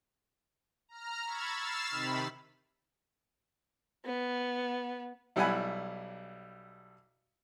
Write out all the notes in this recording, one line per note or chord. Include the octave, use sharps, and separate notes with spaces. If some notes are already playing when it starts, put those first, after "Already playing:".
A#5 F6
B5 C#6 E6 G#6 A6
E6 F6 A6 C7 E7
C3 D#3 B5
B3
B1 G3 E4 F#5 G#5 B5